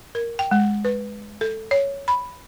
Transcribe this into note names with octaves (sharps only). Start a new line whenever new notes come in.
A#4
G5
G#3
B4
A4
C#5
B5